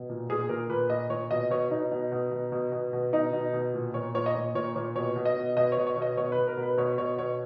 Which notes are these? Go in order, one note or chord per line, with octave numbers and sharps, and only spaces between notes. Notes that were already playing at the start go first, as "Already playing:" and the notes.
Already playing: B2
A#2
A#2 G#4
A#2 A#4
A#2 B4
A#2 D#5
A#2 C#5
B2 D#5
B2 C#5
B2 D#4
B2
B2
B2
B2
B2
B2
B2 D#4
B2
B2
A#2
A#2 C#5
A#2 C#5
D#5
A#2 C#5
A#2 C#5
A#2 C#5
B2 C#5
B2
D#5
B2
B2 D#5
C#5
B2
C#5
B2
D#5
B2 C#5
B4
B2
A#4
B2
B4
B2 C#5
B2 C#5
B2 C#5